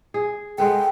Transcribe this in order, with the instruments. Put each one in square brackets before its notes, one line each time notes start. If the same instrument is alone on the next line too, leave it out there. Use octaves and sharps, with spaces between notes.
[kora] G#4
[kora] G#3 B3 A4 [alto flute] G5